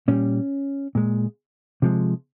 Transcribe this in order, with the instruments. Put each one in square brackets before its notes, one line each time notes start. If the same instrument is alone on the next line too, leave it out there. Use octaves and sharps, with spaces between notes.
[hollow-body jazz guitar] A#2 G3 C#4
A#2 G#3
C3 F3 G#3